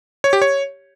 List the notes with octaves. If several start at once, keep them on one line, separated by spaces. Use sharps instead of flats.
C#5
G4
C#5